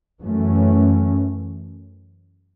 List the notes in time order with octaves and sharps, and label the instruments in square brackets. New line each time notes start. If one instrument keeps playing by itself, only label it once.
[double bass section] F#2 E3 A3 C#4